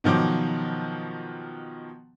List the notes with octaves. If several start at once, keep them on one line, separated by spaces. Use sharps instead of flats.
B2 D#3 F3 F#3 D6